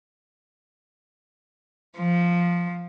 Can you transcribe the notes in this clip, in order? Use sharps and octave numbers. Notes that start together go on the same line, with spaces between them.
F3